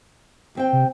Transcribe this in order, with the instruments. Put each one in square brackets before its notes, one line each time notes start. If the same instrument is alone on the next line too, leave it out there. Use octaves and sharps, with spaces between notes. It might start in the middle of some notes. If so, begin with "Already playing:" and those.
[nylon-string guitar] D#2 C4 G5
[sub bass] C3